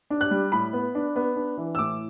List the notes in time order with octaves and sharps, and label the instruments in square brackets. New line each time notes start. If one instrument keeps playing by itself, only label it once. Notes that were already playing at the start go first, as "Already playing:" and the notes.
[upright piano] D4
F#6
G3
A2 B5
B3
D4
B3
D4
E3
E6
A2 D6